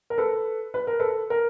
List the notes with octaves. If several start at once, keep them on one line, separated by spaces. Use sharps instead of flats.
A#4
A4 B4
B4
A#4
A4 B4
A#4